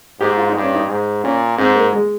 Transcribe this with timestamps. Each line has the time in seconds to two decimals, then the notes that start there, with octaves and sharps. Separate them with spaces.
0.20 G#2 G4
0.37 F4
0.50 D#4
0.55 G2
0.62 C#4
0.75 D#4
0.88 G#2
1.24 A#2 C#4
1.57 G#2 C4
1.75 A#3
1.93 G#3